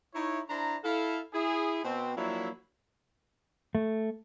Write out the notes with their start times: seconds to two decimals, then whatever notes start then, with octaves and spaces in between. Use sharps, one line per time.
0.14 D#4 E4 C#5
0.49 D4 E4 C5 A#5
0.84 E4 A4 F5
1.34 E4 G#4
1.84 B2 C4
2.17 F3 F#3 A#3 D4 E4
3.75 A3